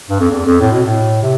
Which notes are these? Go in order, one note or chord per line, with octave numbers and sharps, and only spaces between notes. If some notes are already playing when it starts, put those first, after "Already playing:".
G2
F2
E2
F2
A2
B2
A2
C3